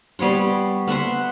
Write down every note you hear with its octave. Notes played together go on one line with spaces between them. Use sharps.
G3 B3 C#5 C6
B3 E5 F#5 C6